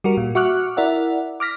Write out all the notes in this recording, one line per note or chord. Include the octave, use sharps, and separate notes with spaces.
G3 F#4 A#4
A#2
F#4 E5 C#6 D6 F6 F#6
E4 A#4 D5 E5 F#5
D6 F6 A#6 B6